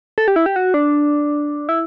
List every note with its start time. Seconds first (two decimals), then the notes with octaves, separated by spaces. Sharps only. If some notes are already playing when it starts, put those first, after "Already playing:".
0.18 A4
0.28 G4
0.36 E4
0.46 G4
0.56 F#4
0.74 D4
1.69 E4